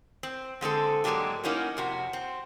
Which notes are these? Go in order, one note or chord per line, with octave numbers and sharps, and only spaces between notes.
C4
D3 G#3 C4 A4
G#2 F#3 G#3 A#3 D4 G4
A#3 C#4 D#4 E4 F#4
F2 C3 F#4
C4